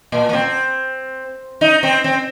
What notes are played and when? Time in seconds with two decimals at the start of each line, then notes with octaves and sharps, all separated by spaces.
0.12 A#2
0.29 A#3
0.33 C4
1.61 D#4
1.83 C4
2.04 C4